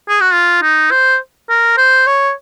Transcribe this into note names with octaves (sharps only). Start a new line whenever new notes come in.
G#4
F#4
F4
D#4
C5
A#4
C5
C#5